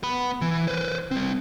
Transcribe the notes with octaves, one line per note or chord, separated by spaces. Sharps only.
B3 B5
E3
B4 C5
G3 C4